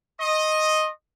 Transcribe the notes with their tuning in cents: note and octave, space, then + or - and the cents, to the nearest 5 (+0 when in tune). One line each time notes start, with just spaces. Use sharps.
D#5 +0 C6 +45